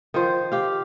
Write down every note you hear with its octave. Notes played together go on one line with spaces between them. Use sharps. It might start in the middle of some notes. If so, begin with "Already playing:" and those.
D#3 F3 C5
G4 F5